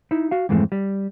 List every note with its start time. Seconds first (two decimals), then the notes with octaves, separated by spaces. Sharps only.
0.11 D#4 E4
0.31 F#4 F5
0.49 F2 G#2 E3 G#3 A3 C4
0.72 G3